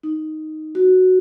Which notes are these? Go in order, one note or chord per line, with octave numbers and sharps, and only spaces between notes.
D#4
F#4